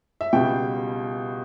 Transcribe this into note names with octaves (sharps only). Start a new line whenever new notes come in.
E5
C#2 B2 G3 G5